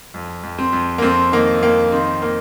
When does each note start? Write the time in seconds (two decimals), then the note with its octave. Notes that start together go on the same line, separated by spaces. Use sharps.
0.14 F2
0.43 F2
0.59 C4
0.73 F2
0.98 A#3
1.02 F2 C4
1.32 D#3 A#3
1.62 F2 A#3
1.92 D#3 C4
2.22 A#3